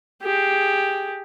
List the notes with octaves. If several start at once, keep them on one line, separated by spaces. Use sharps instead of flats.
G4 G#4